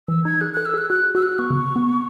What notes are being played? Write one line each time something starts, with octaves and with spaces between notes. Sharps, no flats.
E3 E6
D#4 G#6
G#4 F#6
A4 F#6
E6
G#4 F#6
F#4 F#6
F#4 E6
F#6
B3 C#6
C#3
B3